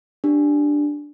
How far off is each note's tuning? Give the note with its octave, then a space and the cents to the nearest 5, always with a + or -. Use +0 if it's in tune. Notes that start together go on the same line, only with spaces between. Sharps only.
D4 +0 G4 +0